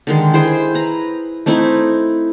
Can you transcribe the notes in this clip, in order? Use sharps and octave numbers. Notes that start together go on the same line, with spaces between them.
D3 D#3 G#3
E4 G#4 C5 G5
B4 A#5
A3 C4 D#4 E4